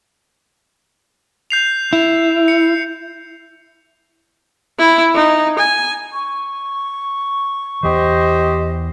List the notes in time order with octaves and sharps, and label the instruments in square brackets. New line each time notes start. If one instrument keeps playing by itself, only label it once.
[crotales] G6 C7 F7
[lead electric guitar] E4 [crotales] F7
[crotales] C#7
[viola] E4
D#4
G#5
[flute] C#6
[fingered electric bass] E2 E3 [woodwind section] G4 C5 D#5